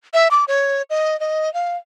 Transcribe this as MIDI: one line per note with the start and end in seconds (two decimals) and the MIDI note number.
0.14 0.28 76
0.31 0.45 86
0.48 0.82 73
0.90 1.18 75
1.20 1.52 75
1.54 1.77 77